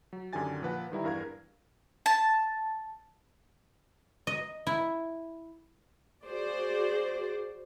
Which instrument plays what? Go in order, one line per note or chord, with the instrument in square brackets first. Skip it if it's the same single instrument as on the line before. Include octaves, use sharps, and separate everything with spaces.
[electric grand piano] F#3
F#2 D3 D#3 G4 G#5 A6
A#2 F3 B4 F#5
D#3 G3 E4 A#5
E2 G2 A#4 F5 G#6
[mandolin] A5
[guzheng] D#5
E4
[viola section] F#4 G#4 C5 D5